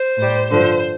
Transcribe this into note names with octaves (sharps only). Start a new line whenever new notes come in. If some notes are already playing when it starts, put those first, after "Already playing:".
Already playing: C5
A2 G3
G2 D3 F3 C5